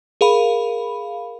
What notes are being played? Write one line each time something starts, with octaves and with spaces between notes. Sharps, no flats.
G#4 A#4 F5 B5